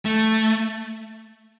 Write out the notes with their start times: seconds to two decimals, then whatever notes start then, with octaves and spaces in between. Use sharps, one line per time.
0.05 A3